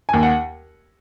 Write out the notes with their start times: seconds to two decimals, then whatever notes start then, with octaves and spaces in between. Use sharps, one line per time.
0.09 D#2 G#5
0.23 F#5